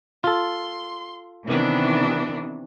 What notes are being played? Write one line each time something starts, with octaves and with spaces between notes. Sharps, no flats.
F4 A4 C6
C3 D#3 E3 B3 D4